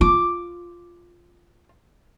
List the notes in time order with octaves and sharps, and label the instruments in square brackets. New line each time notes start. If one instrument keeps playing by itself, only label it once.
[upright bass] F4 [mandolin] D6